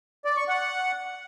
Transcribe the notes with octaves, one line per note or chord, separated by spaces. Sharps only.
D5
C#6
F#5